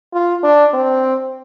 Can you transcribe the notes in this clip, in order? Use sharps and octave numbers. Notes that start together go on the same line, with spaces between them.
F4
D4
C4